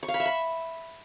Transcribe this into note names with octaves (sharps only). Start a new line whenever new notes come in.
C#6
F5
B5
E5
B5